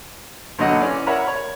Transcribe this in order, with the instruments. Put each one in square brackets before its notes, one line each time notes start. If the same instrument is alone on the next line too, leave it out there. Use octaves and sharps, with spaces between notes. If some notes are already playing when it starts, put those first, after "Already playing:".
[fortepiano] B1 D3 F#3 D#5 F#5
E3 C#4 D5
A#4 C#5 E5 F#5 B5
C#5